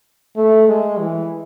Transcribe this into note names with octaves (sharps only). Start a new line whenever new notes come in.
A3
G#3
E3